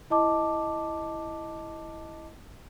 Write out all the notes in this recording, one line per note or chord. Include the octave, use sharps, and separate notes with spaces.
E4 D#5 A5 D6